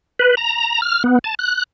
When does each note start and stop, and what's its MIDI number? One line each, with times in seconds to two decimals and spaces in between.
0.19 0.35 71
0.37 0.81 82
0.82 1.03 89
1.04 1.19 59
1.24 1.35 81
1.39 1.63 90